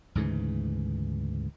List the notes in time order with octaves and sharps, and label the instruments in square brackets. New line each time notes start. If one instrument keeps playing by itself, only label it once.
[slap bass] D2 G#2 C#3 E3